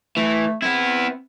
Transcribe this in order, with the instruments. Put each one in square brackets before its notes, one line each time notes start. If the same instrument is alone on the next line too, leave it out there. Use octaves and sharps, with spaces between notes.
[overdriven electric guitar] E3 [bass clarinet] A3
[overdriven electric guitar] B3 E4 [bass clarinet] C4